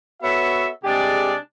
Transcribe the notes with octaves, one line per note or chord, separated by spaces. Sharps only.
B3 F#4 A4 C#5 E5
C3 G#3 D4 G4 G#4 D5